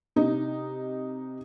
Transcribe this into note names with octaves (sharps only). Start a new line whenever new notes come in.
C3 D#4